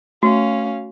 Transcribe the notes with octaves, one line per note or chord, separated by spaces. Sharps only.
A3 C#4 F#4 F5